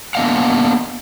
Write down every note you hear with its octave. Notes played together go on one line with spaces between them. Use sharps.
A#3 B3 D4 D#5 F5 F#5